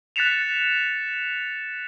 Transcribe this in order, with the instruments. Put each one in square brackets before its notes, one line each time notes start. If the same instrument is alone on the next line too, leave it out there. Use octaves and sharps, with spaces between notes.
[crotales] F#6 A6 B6 C#7 E7 F7